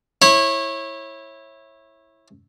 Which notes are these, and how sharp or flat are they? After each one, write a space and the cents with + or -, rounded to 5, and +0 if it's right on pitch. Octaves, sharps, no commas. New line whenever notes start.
E4 -5 C#5 -25